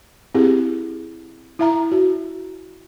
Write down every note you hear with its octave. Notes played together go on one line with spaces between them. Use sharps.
C4 E4 G4 G#4
E4 E5 A#5
F#4